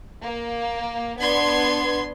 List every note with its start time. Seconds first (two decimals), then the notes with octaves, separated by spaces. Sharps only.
0.22 A#3
1.20 B3 D4 C6 G#6